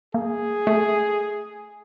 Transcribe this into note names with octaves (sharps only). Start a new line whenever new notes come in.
A#3 G#4
A3